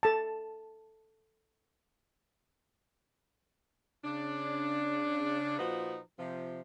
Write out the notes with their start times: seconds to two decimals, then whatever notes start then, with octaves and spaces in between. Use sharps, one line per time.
0.03 A4 A5
4.05 C#3 D4
5.59 A#2 F3 D#4 F#4 B4
6.19 C3 F3